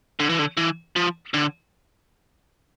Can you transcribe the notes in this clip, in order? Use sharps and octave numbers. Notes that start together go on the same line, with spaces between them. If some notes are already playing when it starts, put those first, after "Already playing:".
D3
E3
D3
E3
F3
D3